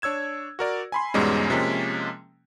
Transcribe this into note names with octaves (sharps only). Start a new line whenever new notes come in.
D4 C#5 E6 G#6 E7
F#4 A#4 D5
G#5 B5 C6
E2 G#2 B2 G3 G#3 C#4
C3 F3 G#3 A#3 C#4